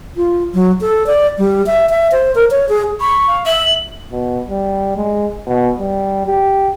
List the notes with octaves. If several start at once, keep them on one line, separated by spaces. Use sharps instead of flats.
F4
F#3
A4
D5
G3
E5
E5
C5
A#4
C#5
G#4
B5 C#6
F5
E5 F#7
B2
G3
G#3
B2
G3
G4